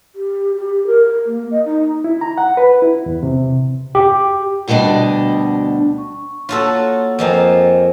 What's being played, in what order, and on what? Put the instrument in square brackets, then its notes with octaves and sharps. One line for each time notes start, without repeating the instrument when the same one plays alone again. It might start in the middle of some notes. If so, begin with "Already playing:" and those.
[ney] G4
G4
A#4
A#3
D#5
D#4
[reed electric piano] E4
A#5
F#5
B4
E4
E2
C3
[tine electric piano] G4
[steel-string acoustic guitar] D2 B2 G3 A3 D4 D#5
[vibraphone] C#6
[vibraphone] A#3 C#5 [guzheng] F4 F#4 A4
[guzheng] F2 F3 A#3 [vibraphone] D#5 G5 G#5